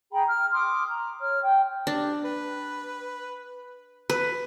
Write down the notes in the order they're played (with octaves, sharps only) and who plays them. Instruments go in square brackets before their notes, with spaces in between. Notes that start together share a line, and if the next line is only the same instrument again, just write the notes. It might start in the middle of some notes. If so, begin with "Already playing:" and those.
[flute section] G#4 G5 A#5 B5
F6
C6 D6 D#6 F6
A#5
C#5 F6
G5
[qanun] D4 [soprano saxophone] G4
[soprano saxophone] B4
[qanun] B4